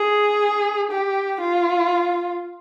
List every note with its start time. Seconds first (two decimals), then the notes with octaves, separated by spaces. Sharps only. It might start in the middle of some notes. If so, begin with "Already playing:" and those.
Already playing: G#4
0.91 G4
1.40 F4